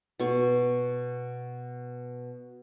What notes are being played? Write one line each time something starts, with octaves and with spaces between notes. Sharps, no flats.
B2 C#6